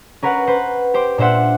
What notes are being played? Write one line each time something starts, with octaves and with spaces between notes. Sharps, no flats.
C#4 A#4 B4 F#5
B4 C5
G4 C5 D6
A#2 D4 C5 E5 F#5